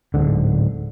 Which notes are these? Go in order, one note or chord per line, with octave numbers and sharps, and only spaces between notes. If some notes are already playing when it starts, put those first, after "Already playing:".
D1 A#1 G#2 D3